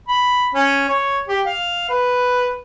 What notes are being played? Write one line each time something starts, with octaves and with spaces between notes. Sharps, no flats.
B5
C#4
C#5
G4
F5
B4